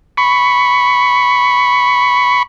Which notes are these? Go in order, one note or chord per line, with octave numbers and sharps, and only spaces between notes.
B5 C#6